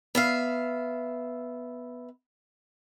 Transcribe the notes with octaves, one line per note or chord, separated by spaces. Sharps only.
B3 E5 F5